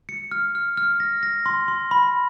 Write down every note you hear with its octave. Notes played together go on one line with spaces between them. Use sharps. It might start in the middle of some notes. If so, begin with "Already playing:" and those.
C#7
F6
F6
F6
A#6
A#6
C6
C6
B5